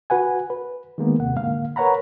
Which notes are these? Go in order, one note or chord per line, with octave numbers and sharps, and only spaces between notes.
F#4 B4 F#5 G#5
B4
D#3 G#3 A#3 B3
D#2 C3 F#5
G#2 D3 A#3 F5
A#4 B4 C#5 F#5 A#5 B5